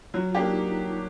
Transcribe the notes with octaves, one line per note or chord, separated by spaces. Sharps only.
F#3 F4
A#3 D4 D#4 G4